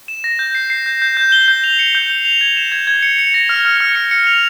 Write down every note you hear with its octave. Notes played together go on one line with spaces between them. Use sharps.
E7
A#6
G6
C7
C7
G6
G6
G6
G7
G6
F7
C#7
G6
F7
F7
G#6
E7
G#6
G#6
C#7
C#7
A#6
F6
F6
F6
C#7
C#7
F7